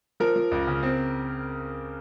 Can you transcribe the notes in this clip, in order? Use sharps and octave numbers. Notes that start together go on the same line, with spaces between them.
F3 A#4
F3
C#2
C#3
C4